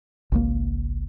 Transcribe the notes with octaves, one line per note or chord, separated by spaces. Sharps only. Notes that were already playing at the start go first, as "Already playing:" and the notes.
G#1 C#2 A#3